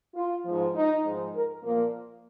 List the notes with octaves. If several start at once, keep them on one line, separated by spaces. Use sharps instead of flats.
F4
G#2 F3
D#4
G#2 F3
A#4
A#2 F3 A#3